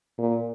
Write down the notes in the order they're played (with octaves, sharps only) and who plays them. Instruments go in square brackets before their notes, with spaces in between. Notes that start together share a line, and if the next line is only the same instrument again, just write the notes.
[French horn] A#2